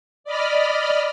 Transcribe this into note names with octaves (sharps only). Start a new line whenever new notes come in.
D5 D#5 B5 F6